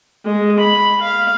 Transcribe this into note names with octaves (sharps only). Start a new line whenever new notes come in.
G#3
B5
F5